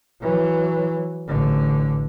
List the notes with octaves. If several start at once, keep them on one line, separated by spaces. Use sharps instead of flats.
E3 F#3
A1 D3